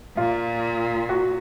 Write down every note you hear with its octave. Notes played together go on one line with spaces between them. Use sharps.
A#2 F4
F#4